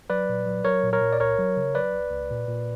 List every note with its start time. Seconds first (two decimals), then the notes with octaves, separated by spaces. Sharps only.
0.10 F#3 B4 D5
0.29 A#2
0.46 F#3
0.65 F#3 A#4 C#5
0.83 A#2
0.93 A#4 C#5
1.01 A#2
1.13 D5
1.19 C#2 A#4 C#5
1.39 F#3
1.57 C#3
1.75 F#3 B4 D5
1.93 C#2
2.11 C#2
2.30 A#2
2.48 A#2